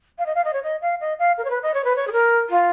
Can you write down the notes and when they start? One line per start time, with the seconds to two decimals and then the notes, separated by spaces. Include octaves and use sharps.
0.18 F5
0.25 D#5
0.35 F5
0.44 D#5
0.53 C#5
0.63 D#5
0.81 F5
1.00 D#5
1.19 F5
1.37 A#4
1.44 C#5
1.50 B4
1.62 D#5
1.74 C#5
1.84 B4
1.96 C#5
2.07 G#4
2.12 A#4
2.49 F4